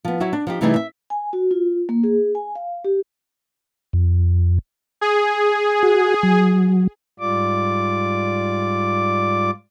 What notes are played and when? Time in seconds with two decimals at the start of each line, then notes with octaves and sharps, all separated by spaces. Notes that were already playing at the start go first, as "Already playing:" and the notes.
0.05 F3 B3
0.20 F#3 E4 F#4 E5
0.33 D4
0.47 F3 D#4 G4
0.61 C3 E3 G3 A3 D#4 G#4
0.76 E5
1.10 G#5
1.33 F#4
1.51 F4
1.89 A#3
2.04 G#4
2.35 G#5
2.55 F5
2.84 G4
3.93 F2
5.01 G#4
5.83 F#4
6.23 F#3
7.19 G#2 G3 F4 D5 D6